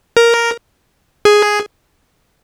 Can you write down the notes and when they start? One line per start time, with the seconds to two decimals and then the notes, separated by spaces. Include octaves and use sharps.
0.17 A#4
1.25 G#4